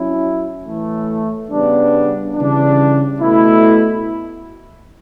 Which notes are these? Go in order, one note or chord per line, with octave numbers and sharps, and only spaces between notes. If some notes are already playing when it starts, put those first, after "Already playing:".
Already playing: F#3 C#4 E4
A2 E3 A3
C#3 G3 B3 D4
C#3 E3 G3 D4
B2 A3 E4